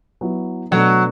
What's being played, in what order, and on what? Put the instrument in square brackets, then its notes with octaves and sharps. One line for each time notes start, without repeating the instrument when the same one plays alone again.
[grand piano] F#3 B3 E4
[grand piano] B2 A3 D4 [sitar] F#3